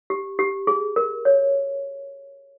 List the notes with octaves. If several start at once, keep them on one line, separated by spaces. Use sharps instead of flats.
G4
G4
G#4
A#4
C#5